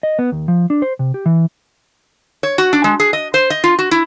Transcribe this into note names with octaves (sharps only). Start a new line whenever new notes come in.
D#5
B3
D#2
F3
D4
C5
C3
G4
E3
C#5
F#4
D4
G#3
G#4
D#5
C5
D#5
F4
F#4
E4